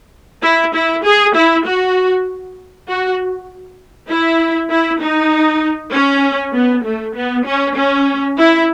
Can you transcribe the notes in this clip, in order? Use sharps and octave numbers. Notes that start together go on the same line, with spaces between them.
E4
E4
G#4
E4
F#4
F#4
E4
E4
D#4
C#4
B3
A3
B3
C#4
C#4
E4